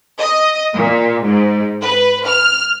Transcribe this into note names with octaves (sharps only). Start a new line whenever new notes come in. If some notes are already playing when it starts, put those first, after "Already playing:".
D#5
A#2
G#2
B4
F6